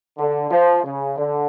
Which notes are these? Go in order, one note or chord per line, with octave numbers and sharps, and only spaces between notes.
D3
F3
C#3
D3